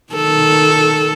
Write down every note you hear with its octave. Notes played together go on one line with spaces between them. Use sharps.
D#3 A4